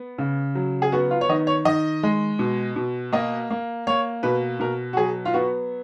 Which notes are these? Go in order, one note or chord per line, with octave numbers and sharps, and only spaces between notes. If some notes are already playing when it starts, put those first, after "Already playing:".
Already playing: B3
C#3
F#3
G#4
B3 F#4
F4
C#5
D#3 D#5
C#5
D#3 D#5
G#3
B2
B2
A#3 D#5
A#3
A#3 C#5
B2 B4
B2 A#4
F#4
F#3 G#4
F4
B3 F#4